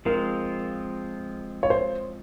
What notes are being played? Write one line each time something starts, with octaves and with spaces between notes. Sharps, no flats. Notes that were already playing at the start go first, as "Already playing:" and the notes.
F3 G#3 C4 F4 A#4
C#5
C5